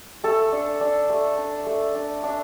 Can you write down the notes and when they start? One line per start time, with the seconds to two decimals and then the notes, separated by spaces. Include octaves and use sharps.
0.24 A3 A4
0.52 D4
0.81 D4
1.10 A3
1.38 D4
1.67 A3
1.95 D4
2.24 D4